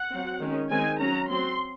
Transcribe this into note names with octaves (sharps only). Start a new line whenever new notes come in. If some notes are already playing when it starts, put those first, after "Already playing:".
Already playing: F#5
F#3 C4
D#3 G#3 C#4
D#3 G#3 C4 G#5
F#3 C#4 A#5
F#3 C4 C6